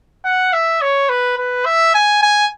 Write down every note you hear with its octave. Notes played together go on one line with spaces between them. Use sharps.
F#5
E5
C#5
B4
B4
E5
G#5
G#5